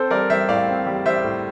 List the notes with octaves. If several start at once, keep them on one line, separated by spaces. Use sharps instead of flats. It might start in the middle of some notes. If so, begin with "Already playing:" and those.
Already playing: C4 A4 C5
G3 A#4 D5
G3 C5 E5
A2 D5 F5
C4
G3
G3 C5 E5
A2